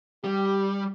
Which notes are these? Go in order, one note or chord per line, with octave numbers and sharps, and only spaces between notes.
G3 G4